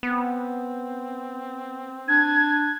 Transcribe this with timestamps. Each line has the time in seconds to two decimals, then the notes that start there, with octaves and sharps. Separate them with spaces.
0.03 B3 C4
2.08 D4 G#6